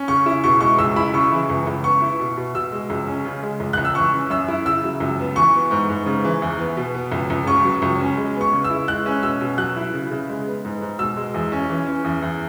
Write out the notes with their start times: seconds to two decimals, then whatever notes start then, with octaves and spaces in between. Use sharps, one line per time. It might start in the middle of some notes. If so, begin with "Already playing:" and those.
Already playing: C#4
0.08 C#3 C#6
0.26 E4
0.44 B2 C#6
0.61 G#3 C#6
0.78 C#2 E6
0.96 E4 B5
1.14 C#3 C#6
1.32 E3
1.49 C#2
1.67 C#2
1.84 B3 C#6
2.02 E4
2.20 B2
2.37 B2
2.55 B2 E6
2.72 G#3
2.90 C#2
3.07 C#4
3.25 C#3
3.43 G#3
3.60 C#2
3.73 C#2 F#6
3.85 E6
3.95 E3 C#6
4.13 C#4
4.30 F#2 E6
4.48 E4
4.65 C#3 E6
4.84 F#3
5.00 C#2
5.19 B3
5.36 E3 C#6
5.54 B3
5.71 G#2
5.89 G#2
6.06 C#3
6.25 E3
6.42 E2
6.59 B3
6.77 B2
6.94 B3
7.12 C#2
7.30 C#2
7.47 C#3 C#6
7.65 F#3
7.82 C#2
8.00 C#4
8.17 G#3
8.35 B3
8.41 C#6
8.53 C#3
8.64 E6
8.70 E4
8.88 G#3 F#6
9.06 C#4
9.23 B2 E6
9.41 B2
9.58 F#3 F#6
9.76 E4
9.94 C#3
10.11 C#3
10.29 G#3
10.46 B3
10.65 G#2
10.81 G#2
10.99 B2 E6
11.17 G#3
11.34 E2
11.52 C#4
11.70 E3
11.87 C#4
12.04 E2
12.22 E2